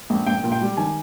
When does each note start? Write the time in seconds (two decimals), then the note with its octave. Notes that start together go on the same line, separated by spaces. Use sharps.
0.10 A#1
0.27 A#1 G5
0.44 A#2
0.52 G5
0.61 G3
0.77 D#3 G#5